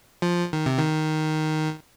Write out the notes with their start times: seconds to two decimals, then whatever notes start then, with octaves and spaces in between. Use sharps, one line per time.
0.22 F3
0.53 D#3
0.66 C3
0.79 D#3